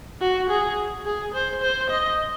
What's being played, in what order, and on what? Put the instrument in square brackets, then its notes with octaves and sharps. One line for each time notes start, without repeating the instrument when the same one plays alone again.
[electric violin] F#4
G#4
G#4
C5
C5
D#5